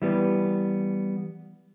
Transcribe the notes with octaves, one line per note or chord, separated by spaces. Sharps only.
E3 G3 B3